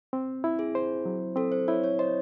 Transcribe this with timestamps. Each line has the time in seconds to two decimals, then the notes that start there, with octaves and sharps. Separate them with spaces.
0.13 C4
0.44 E4
0.59 G#4
0.75 C5
1.05 F#3
1.36 C4 A4
1.52 C5
1.68 E4 C#5
1.84 C#5
1.99 C5 D#5